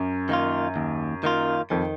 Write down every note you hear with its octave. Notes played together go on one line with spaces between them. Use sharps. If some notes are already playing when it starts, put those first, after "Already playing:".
Already playing: F#2
D#3 A#3 F4
D#2
D#3 A#3 F4
F2 D#3